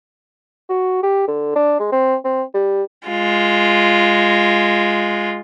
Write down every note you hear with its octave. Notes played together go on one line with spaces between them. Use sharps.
F#4
G4
D3
D4
G#3
C4
C4
G3
G#3 F4